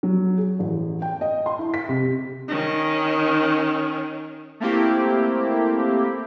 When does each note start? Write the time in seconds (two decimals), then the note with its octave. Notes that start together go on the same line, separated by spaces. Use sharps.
0.03 F#3
0.38 G#4
0.59 A1
1.02 G5
1.21 D#5
1.46 C6
1.59 E4
1.74 B6
1.89 C3
2.48 D#3 C#4
4.60 A3 A#3 C4 E4 G4